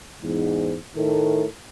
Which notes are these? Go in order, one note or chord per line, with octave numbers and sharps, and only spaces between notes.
E2 G#2
A2 D#3 A3 A4 A#4